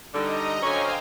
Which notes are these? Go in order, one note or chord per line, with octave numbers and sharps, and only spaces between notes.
D3 G3 D#4 D#5 A#5
D3 F#3 C#4 C5 C#5 F5 G5 G#5